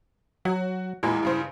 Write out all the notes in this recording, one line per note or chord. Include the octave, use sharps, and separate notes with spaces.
F#3 F#4
E2 A#2 G#3 E4
G2 C#3 C5